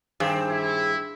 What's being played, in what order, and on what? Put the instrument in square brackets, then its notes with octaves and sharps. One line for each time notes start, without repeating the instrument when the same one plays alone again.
[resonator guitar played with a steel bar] G2 [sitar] D#3 C4 G#4
[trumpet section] E4